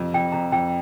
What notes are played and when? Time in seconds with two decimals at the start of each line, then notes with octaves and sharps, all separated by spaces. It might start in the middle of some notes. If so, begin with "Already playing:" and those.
Already playing: F2 C3
0.14 F2 G5
0.32 F2 A#5
0.52 F2 G5